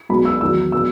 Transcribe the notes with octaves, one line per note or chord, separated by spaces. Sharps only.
B1 B2 G#3 B5
E6
E2 D#3 F#3 E6
B2 F#3 E6